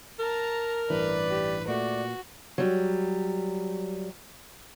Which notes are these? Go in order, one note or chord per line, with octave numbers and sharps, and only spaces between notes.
A#4 A5 A#5
A1 G2 E3 B4 D5
G4
A#2 A3 F#4 D5
F#3 G3